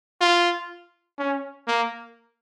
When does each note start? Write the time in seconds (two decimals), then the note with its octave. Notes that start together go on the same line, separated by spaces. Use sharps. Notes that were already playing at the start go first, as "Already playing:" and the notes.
0.21 F4
1.19 C#4
1.67 A#3